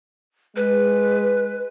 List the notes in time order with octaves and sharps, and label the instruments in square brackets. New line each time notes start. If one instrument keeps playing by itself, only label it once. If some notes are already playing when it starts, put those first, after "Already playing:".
[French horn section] G#3 [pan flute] B4